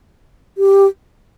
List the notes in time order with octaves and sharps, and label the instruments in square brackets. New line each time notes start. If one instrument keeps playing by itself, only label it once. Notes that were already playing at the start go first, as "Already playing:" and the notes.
[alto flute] G4